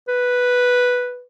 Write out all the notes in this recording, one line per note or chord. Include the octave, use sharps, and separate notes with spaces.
B4